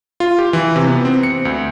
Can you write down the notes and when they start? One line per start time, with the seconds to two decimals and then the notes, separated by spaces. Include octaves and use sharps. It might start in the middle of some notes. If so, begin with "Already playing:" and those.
0.20 F4
0.39 G4
0.53 E3
0.76 C3
0.88 B3
1.05 C4
1.23 C#7
1.45 D2